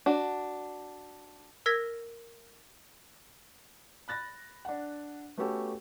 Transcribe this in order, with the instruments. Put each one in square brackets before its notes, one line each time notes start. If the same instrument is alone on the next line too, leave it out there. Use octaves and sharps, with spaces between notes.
[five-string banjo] D4 F#4
[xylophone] A#4 E6 G#6 A#6 B6
[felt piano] B5 F#6 A6 A#6
D4 F#5
A3 B3 C#4 F#4 G4 A4